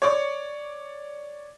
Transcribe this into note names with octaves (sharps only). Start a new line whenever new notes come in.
C#5 D5 C#6